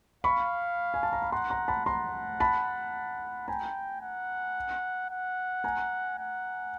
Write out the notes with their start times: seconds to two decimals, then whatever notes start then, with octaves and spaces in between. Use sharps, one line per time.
0.24 F5 B5 C#6
0.94 G#5
1.03 A5
1.13 A#5
1.22 B5
1.32 F#5 A#5 C6
1.50 A#5 C6
1.68 A5 B5
1.86 F#5 A#5 C6
2.40 A5 B5
3.48 G5 G#5 A#5
4.01 F#5
5.10 F#5
5.64 G#5 A#5
6.18 F#5